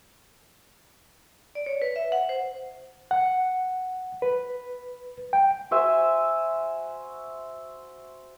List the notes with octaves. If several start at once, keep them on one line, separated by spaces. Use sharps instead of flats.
D5
C#5
B4
E5
F#5
C5
F#5
B4
G5
F#4 C5 E5 G#5